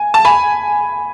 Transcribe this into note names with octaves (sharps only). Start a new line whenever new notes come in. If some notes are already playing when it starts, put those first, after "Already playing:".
Already playing: G#5
A5
G#5 B5